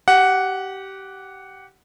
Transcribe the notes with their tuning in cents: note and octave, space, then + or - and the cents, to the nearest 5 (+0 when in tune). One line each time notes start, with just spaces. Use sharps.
G4 -20 F#5 +0